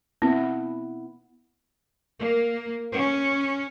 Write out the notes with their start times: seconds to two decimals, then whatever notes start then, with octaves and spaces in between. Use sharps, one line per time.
0.22 B3 C4 E4
2.20 A#3
2.94 C#4